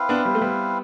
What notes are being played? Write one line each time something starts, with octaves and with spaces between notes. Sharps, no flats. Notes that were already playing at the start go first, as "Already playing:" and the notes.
Already playing: C4 E4 B4 F5
B3 D4
G3 B3
A3
G3 B3